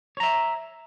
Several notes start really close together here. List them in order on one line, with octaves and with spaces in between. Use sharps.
C#5 A#5 E5